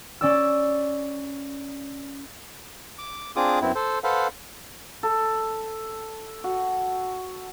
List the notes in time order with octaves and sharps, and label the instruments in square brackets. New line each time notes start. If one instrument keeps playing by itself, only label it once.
[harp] C#4 D5 E6
[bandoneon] D6
C4 D4 F4 G#4 D6 D#6
F#2 B3 C4 E4
A4 C5
A4 B4 C5 F5 F#5
[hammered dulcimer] A4
F#4